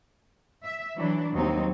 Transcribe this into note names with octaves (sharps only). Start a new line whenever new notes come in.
E5
E3 F#3 D4
D#2 B2 F#3 G3 C4 D#4